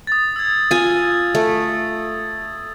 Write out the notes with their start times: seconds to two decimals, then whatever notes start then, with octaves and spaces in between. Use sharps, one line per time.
0.07 D#6 A6
0.36 E6 G#6
0.71 F4 G#5
1.35 A3